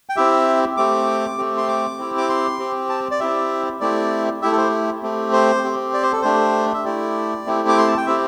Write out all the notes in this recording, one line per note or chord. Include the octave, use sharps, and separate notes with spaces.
G5
C4 E4 G4 E5
A3 C4 G4 D6
A3 C4 G4
C6
D6
C4 E4 G4
D6
C6
C4 G4
A5
D5
C4 E4 G4 E5
A3 C4 E4 G4 D5
A3 E4 G4 E5
A4
C5
A3 C4 G4
C5
C4 G4
D5
C5
A4
A3 D4 G4 C5
E5
A3 E4 G4 D5
A3 C4 E4 G4
D6
C6
A5
G5
C4 E4 G4 E5